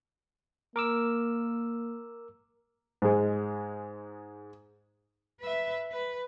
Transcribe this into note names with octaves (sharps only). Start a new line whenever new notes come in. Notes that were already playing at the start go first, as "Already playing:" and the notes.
A#3 A#4 D6 E6
G#2 G#3
B4 E5
B4